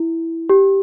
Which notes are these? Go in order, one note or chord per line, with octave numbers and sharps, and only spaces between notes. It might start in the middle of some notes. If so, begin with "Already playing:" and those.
Already playing: E4
G4